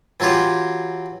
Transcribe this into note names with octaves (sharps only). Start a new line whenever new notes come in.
E3 F#3 C#4 F4 G4